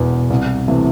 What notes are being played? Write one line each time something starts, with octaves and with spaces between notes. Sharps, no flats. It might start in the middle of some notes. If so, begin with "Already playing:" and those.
Already playing: E1 E2 B2
C2
C3 E3 A3